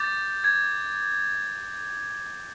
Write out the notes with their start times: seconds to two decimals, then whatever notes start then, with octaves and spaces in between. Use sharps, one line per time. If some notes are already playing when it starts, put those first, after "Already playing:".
Already playing: D6 G6 A6
0.44 G#6